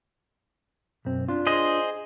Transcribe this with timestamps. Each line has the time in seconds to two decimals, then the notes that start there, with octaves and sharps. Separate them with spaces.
1.05 B1 F#2 C4
1.28 D4 F4
1.47 G#4 C5 D#5